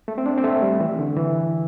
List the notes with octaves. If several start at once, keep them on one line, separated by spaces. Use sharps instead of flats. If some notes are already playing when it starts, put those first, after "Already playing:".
A3
C4
D4
C4
A3
G3
E3
D3
E3